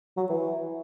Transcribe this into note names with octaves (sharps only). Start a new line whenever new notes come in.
F#3
E3